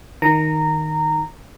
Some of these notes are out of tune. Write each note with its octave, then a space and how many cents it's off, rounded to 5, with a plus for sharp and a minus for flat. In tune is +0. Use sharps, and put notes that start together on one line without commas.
D#3 +0 A#5 -15